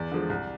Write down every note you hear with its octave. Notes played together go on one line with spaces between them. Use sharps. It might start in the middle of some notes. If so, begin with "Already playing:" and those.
Already playing: E2 D5
D3 F3 G#3
C2